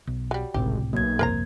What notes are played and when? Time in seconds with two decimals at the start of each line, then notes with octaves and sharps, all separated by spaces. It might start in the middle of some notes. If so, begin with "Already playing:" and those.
0.07 B1
0.31 F#3 G3
0.54 G#1 C#2 A2 C3 G4
0.93 B1 A#3 G#6
1.19 G1 C2 F2 A#4 C5 A#5